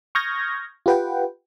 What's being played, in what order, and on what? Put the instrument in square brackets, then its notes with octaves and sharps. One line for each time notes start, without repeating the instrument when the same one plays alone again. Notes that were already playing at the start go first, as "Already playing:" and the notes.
[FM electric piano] C#6 D#6 F6 G6 G#6 A#6
F4 G4 B4 F#5 G5